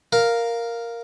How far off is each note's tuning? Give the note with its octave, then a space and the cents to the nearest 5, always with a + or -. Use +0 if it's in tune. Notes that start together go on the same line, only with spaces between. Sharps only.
A#4 +0 F5 +0